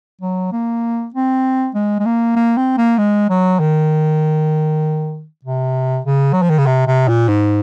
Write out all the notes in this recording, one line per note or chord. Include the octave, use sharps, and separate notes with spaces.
F#3
A#3
C4
G#3
G#3
A#3
A#3
C4
A#3
G#3
F#3
D#3
C3
C#3
F#3
F3
D#3
C#3
C3
C3
A#2
G#2